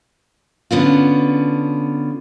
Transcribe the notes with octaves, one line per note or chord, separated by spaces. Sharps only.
D3 B3 C#4 F4